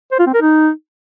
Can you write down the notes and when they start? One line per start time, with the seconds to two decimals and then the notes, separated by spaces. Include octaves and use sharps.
0.12 C5
0.19 F4
0.27 C4
0.34 A#4
0.42 D#4